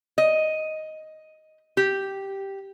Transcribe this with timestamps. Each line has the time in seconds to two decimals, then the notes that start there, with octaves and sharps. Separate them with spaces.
0.18 D#5
1.77 G4